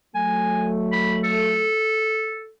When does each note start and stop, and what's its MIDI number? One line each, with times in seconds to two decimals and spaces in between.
0.15 1.69 54
0.15 1.69 57
0.15 0.70 80
0.93 1.16 83
1.24 2.51 69